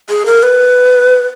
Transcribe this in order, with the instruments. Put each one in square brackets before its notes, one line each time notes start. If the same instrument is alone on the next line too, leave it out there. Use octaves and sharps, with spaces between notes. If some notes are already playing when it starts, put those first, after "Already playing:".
[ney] G#4
A#4
B4